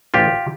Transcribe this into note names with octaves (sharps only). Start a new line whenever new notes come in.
A1 F4 G4